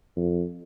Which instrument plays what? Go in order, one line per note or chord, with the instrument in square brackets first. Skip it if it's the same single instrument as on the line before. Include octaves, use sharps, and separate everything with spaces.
[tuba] F2